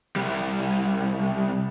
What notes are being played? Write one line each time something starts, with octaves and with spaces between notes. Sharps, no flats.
C2 G3